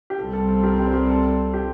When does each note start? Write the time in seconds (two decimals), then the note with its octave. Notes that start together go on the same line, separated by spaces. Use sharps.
0.10 G4
0.18 C2 C3 G3 C4 A4
0.33 A4
0.48 A4
0.63 G4 A#4
0.79 G4 A#4
0.87 C5
0.94 G4 A#4
1.09 A4
1.54 G4